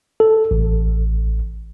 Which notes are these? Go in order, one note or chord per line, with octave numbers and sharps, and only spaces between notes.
A4
A1